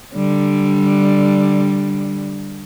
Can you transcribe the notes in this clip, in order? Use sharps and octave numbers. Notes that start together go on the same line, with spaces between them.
D3 G3